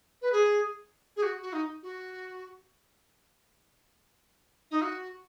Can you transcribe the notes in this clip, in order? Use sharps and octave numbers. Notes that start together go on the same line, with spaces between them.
B4
G#4
G#4
F#4
F#4
D#4
F#4
D#4
F#4